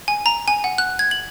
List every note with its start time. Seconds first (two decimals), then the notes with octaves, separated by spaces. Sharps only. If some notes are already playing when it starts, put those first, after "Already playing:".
0.08 G#5
0.26 A#5
0.48 G#5
0.64 F#5
0.78 F#6
0.99 G#6
1.11 F#7